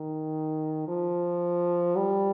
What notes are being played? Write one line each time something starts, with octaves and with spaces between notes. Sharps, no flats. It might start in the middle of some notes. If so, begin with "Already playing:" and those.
Already playing: D#3
F3
G3